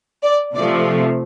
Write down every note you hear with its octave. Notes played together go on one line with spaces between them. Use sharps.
D5
C3 F3 A3 D5